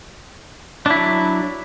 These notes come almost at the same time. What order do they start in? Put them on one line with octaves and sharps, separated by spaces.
D4 E4 F#3